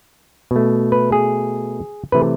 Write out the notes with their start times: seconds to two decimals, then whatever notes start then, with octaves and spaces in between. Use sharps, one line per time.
0.51 B2 A3
0.92 B4
1.12 G#4
2.12 C3 E3 A3 B4